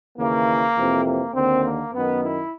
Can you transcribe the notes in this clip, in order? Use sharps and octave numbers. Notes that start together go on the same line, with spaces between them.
D#2 C#3 E3 A#3
F2 C3 E3
A#3
D#2 D3 C4
A#3
F#2 D#3 B3
E4